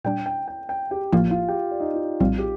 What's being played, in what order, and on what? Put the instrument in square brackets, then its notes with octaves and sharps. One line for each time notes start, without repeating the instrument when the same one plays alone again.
[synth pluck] A#2 G3 D4 [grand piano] G5
[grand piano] G5
G5
G5
G4 G5
[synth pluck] A1 A2 F3 A#3 [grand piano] F4 F5
[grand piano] F4 F5
G4 G5
D5
D#4 D#5
F4
[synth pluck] A#1 A2 G3 C4 [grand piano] F4
[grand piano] G4